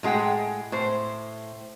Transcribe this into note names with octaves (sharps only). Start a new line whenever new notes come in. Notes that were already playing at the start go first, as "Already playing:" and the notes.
A2 G#3 G#4 F#5 G5
A2 C5